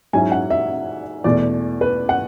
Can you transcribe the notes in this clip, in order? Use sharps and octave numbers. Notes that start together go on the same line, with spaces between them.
G#2 F#3 C#4 E4 G#5
F#5
E5
E2 B2 A3 D5
B4
F#5